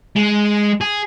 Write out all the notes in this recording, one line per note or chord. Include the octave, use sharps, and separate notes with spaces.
G#3
G#4